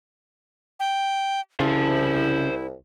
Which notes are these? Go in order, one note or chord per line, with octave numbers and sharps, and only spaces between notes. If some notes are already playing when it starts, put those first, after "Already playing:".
G5
C2 C#3 E4 C5 A5